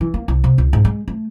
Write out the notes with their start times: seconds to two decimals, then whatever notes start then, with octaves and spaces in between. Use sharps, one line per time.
0.01 E3
0.14 A#3
0.28 C2
0.44 C3
0.58 C#2
0.73 G#2
0.85 G#3
1.08 A3